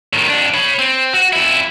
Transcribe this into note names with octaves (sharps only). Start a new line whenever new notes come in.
A2 D#3
F2 D4
C#5 B5
C4
F#4
F2 E4